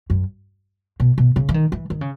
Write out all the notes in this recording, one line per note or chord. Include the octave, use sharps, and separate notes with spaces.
F#2
B2
B2
C#3
E3
D#3
E3
D#3
C#3